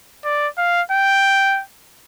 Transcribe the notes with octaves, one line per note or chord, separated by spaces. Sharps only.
D5
F5
G5